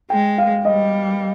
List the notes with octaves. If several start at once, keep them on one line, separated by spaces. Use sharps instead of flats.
G#3 G5
F5
G3 D#5